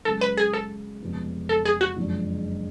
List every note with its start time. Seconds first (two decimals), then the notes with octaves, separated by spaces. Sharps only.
0.05 F#2 C#3 G#3 A4
0.21 B4
0.37 G#4
0.54 A4
1.01 F1 F2 C#3 G#3 B3
1.49 A4
1.65 G#4
1.81 F#4
1.97 F#1 F2 D3 G#3 D4